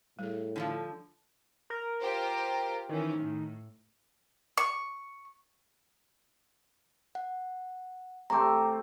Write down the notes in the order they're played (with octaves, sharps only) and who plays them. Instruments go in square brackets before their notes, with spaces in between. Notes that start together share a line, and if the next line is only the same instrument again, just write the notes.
[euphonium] A2 [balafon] G3 G#4
[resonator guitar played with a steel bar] D3 E3 F3
[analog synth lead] A#4
[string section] F4 G4 C5
[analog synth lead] D#3 [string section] E3 C#4
[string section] A2
[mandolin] C#6
[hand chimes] F#5
[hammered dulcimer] C3 A3 C4 [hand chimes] A#5 D6